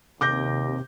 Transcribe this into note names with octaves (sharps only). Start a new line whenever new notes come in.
D#2 C3 D6 G6 A#6